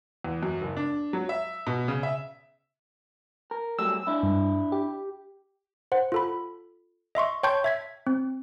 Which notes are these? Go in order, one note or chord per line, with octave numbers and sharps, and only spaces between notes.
E2
F#2
F#1
D4
F#3
E5
B2
C#3
E5
A#4
F#3 G3 A3 E6
D4 E4
G2
G4
C5 F#5
F4 A4 B5
D#5 E5 C6 C#6
C#5 G5 A5 C6 C#6 G6
E5 G#6 B6
C4